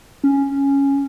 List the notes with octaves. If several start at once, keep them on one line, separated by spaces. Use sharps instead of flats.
C#4